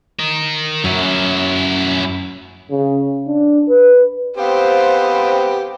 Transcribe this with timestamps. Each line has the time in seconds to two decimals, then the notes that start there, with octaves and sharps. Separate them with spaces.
0.19 A#4 D#5
0.84 F#2 F#3 C#4 E4
2.71 C#3
3.27 D4
3.69 B4
4.37 B3 C4 G4 C5 F5